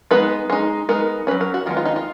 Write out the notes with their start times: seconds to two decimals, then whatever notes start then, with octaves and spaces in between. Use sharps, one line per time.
0.11 G#3 B3 D#4 B4
0.50 G#3 D#4
0.89 G#3 B3 D#4 A#4
1.27 F#3 C#4 B4
1.41 A#4
1.54 F#4
1.66 D#3 G#3 B3 F4
1.77 F4
1.86 D#4
1.96 F4